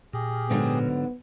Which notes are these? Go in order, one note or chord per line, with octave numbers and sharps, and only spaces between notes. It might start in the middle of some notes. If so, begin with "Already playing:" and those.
A#2 G4 G#4
G#2 D3 F#3 B3